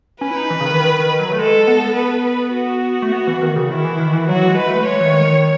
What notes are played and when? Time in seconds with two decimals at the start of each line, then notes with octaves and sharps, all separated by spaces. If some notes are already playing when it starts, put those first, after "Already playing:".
0.21 C#4 B4
0.31 E4
0.36 D#4
0.50 E3
0.60 C#3
0.66 D#3
0.80 D#3
1.00 D#3
1.19 F#3
1.32 A3
1.38 G#3 A4
1.67 B3
1.96 B4
2.25 B4
2.54 F#4
3.02 A3
3.13 B3
3.27 E3
3.42 D#3
3.56 C#3
3.70 D#3 E4
3.85 E3
3.99 D#3
4.13 E3
4.28 F#3 F#4
4.48 G#3
4.57 B4
4.67 A3
4.86 G#3 C#5
5.00 E3
5.05 D#3
5.25 D#3